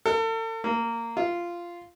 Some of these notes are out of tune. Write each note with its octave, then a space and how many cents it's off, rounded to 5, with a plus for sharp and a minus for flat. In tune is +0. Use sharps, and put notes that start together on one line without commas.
A4 +40
A#3 -15
F4 -10